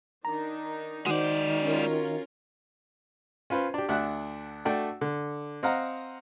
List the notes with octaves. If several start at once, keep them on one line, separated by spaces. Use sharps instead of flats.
D#3 D4 D#4 A#5
D#3 G#3 F#4 C5 D5
C#4 F4 A#4
C#4 F4 B4 C5
D4 G4
D2 D4 E5 F#5 F#6
A3 D4 F#4 G5
D3
C4 D#5 F5 F#5 A#5